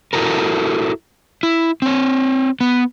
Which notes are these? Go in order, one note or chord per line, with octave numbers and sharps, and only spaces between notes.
E4 F#4 A4 A#4
E4
C4 C#5
B3